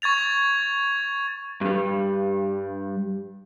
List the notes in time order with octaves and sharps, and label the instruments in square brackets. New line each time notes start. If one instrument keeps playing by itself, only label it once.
[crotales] C#6 G#6 A6 F7
[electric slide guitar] G2 G3